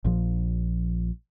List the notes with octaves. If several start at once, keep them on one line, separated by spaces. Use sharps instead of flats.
A#1 A#2 F3